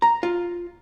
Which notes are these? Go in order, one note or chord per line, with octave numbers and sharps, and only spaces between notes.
A#5
F4